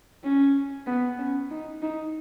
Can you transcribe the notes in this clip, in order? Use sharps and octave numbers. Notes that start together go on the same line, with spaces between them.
C#4
B3
C#4
D#4
D#4